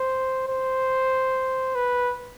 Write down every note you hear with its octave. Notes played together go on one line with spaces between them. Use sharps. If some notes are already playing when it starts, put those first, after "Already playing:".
Already playing: C5
C5
B4